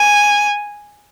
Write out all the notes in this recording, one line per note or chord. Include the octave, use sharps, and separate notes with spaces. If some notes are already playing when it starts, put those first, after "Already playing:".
Already playing: G#5